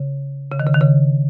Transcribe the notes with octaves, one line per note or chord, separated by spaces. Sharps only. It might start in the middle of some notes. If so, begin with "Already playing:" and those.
Already playing: C#3
C#3
D#3
C#3
D#3
C#3